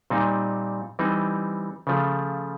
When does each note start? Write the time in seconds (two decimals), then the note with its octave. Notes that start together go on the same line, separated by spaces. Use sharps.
0.10 A#2 G3 C4 D#4
0.99 E3 G3 C4 D#4
1.87 C#3 F3 A3